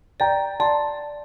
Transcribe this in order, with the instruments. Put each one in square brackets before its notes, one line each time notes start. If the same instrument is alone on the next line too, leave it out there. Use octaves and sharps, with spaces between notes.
[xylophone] D5 [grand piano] G5 A#5
[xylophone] D5 [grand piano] A5 C6